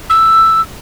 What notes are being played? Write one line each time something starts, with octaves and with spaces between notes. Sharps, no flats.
E6